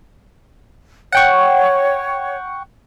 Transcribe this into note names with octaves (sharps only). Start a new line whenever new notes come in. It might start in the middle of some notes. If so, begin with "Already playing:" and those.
C#5 F#5 G5 C#6